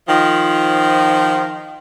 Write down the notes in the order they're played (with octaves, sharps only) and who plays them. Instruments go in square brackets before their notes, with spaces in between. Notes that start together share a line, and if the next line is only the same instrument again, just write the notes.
[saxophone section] D#3 F3